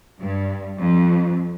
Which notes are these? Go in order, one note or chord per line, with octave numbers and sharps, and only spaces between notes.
G2
F2